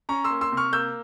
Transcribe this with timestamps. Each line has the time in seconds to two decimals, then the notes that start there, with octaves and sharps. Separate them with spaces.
0.09 C#4 A#5 C#6
0.24 C6 E6
0.30 A#3
0.41 C6 E6
0.52 C3
0.57 C#6 F6
0.72 A#3 E6 G6